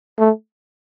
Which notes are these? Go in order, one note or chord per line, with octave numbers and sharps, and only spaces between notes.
A3